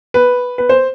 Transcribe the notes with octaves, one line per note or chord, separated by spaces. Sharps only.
B4
B4
C5